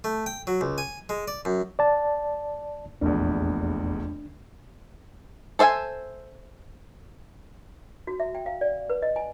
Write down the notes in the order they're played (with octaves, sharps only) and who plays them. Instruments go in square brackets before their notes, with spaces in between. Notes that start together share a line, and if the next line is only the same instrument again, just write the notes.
[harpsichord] A3
G5
F#3
C#2
G#5
G#3
D5
F#2
[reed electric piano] D5 A5
[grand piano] F1 A#1 E2 [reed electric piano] D4
[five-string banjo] A4 C5 E5 F5 G#5
[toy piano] F#4
E5
G5
F5
D5
B4
D#5
G#5